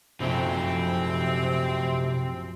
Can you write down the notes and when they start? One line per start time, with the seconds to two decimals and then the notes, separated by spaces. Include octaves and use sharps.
0.20 A#1 F#2 C3 A3 C4